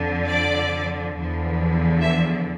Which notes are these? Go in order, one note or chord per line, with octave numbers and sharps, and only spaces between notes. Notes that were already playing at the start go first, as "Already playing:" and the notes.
Already playing: F2 D3 F3
D5
E2 D3 F3
E5